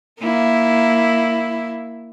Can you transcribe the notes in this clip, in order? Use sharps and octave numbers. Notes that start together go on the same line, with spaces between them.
A#3 E4